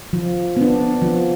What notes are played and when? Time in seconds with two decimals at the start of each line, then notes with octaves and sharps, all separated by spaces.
0.13 F3
0.57 B3 D4
1.02 F3